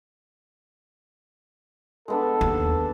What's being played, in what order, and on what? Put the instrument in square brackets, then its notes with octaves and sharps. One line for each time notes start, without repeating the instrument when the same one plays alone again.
[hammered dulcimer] G#3 B3 D4 [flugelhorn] A4
[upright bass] D#2